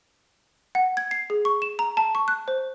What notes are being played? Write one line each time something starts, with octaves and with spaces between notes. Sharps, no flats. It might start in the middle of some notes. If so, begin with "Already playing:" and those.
F#5
G#6
C7
G#4
C#6
E7
A#5
A5
C#6
F#6
C5